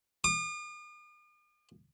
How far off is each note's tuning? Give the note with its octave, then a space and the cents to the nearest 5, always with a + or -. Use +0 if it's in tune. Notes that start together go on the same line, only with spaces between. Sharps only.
D#6 -45